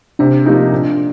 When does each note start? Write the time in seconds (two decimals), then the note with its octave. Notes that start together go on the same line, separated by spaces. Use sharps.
0.19 C3 D4
0.45 F3 A#3 D#4 G4
0.72 A#2